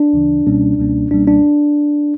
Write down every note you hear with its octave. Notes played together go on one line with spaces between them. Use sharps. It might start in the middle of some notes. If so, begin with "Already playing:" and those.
Already playing: D4
D2 C#3 E3
C#2 B2 G3 A#3 C#4
C#2 B2 G3 A#3 C#4
C#2 B2 G3 A#3 C#4 D4
D4